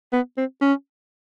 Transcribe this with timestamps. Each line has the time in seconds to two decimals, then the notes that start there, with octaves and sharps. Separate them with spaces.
0.13 B3
0.37 C4
0.61 C#4